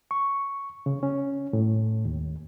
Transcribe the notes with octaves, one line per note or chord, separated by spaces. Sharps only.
C#6
C#3
C#4
A2
D#2